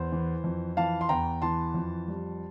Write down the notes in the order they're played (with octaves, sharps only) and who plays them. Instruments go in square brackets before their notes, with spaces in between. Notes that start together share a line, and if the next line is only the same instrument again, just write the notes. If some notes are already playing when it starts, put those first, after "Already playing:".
Already playing: [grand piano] E2 C5
E3
F2
E3 F5 A5
C6
E2 G5 A#5
E3 A5 C6
F2
G3